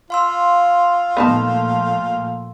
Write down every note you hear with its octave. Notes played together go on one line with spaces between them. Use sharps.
F4 F5 C6 E6
A#2 F3 A3 B3 D#4 A5